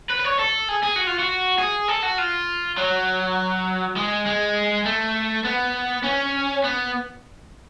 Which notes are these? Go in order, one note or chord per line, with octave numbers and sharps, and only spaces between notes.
B4
B4
C#5
A4
G#4
G#4
F#4
F4
F#4
G#4
A4
F#4
F4
F#3
G#3
G#3
A3
B3
C#4
B3